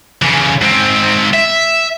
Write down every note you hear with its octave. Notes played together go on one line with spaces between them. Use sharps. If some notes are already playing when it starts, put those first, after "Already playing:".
C#3 E3
G#2 C4
E5